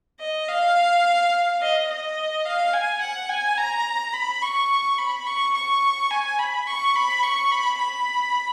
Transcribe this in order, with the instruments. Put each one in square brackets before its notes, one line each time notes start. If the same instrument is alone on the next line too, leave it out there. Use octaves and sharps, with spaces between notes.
[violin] D#5
F5
D#5
D#5
F5
G#5
F#5
G#5
A#5
B5
C#6
B5
C#6
C#6
G#5
B5
C#6
B5
C#6
B5
B5